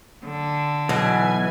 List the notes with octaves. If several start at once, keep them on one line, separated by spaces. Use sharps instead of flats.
D3
B1 B2 E3 G#5